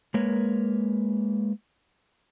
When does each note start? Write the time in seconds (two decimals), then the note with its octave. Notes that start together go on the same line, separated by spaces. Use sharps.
0.14 G#3 A#3 A#4 B4 C#5